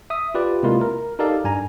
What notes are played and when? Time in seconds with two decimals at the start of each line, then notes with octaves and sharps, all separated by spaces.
0.10 E5 D#6
0.34 F4 G4 B4 D5
0.63 C3 G#3 A#3 E4 F4 A#4
0.81 A#4
1.19 D#4 G4 A4 A#4 D5 F5
1.44 G2 G#5 A#5